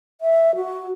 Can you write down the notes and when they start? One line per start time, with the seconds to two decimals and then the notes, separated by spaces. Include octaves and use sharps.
0.21 E5
0.56 F#4